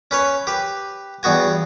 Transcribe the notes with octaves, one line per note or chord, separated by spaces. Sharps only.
C#4 B4 C#5
G4 B4
E2 G2 B3 F#4 G#5